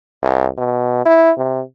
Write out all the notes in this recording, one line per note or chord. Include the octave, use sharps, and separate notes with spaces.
C2
B2
E4
C3